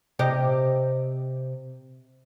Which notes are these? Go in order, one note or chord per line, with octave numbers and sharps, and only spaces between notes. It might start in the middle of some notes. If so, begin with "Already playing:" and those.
C3 G4 D#5